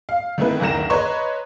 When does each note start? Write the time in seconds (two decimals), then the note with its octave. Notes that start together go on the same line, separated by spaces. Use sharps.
0.09 F5
0.38 D#3 A3 B3 C4 E4 B4
0.60 F#1 D2 D#3 A#4 A#6 E7
0.90 B4 C#5 D#5 A#5 C6 C#6